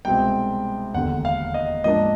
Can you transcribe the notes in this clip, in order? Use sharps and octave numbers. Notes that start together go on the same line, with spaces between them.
C2 B2 G#3 C4 G5
E1 D#2 D3 F#5
F5
D#5
G#2 F3 A#3 D4 D#5